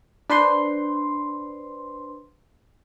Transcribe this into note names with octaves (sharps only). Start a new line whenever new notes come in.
D4 B4 C5 C6